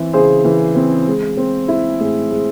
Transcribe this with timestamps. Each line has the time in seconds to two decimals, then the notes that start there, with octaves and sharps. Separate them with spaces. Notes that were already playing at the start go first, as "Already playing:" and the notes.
Already playing: E3 C4 E4
0.13 C#3 G#4 C5
0.45 E3
0.75 C4
1.07 G#3
1.37 C4
1.68 E4
1.99 A2 G#4
2.31 G#3